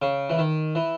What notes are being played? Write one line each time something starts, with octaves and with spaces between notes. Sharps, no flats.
C#3
E3
D#3
E3